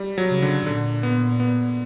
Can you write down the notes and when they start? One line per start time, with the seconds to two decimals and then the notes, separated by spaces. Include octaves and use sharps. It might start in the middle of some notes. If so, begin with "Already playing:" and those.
Already playing: G3
0.18 F#3
0.29 C#3
0.42 D3
0.66 A#2 D3
1.03 B3
1.40 B3